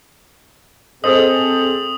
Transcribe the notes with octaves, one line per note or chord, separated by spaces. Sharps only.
C4 G#4 A4 C5 D#5 D#6 F#7